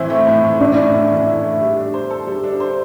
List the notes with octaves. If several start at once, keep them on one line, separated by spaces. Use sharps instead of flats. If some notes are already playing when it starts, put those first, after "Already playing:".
Already playing: A2 E3 C4 E4
A3
A2
E3
D4 E4
A3
A2
E3
E4
A3
G3
D4
C5
A4
G3
D4
C5